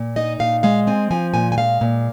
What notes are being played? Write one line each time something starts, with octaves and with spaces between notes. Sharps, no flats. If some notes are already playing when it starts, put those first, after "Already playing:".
Already playing: A#2
D#4 D#5
A#2 F5
G#3 F5
C4 G#5
F3 G#5
A#2 G#5
G#5
G#3 F5
A#2